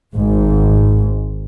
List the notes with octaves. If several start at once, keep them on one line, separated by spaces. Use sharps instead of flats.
G#1 G#2